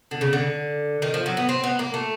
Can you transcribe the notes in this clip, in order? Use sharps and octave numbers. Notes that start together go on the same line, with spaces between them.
D3
C#3
D3
D#3
F3
F#3
B3
C4
B3
A#3
A3